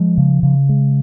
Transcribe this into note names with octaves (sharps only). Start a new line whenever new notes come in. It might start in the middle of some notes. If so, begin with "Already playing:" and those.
Already playing: F3 G#3
C#3
C#3
G#3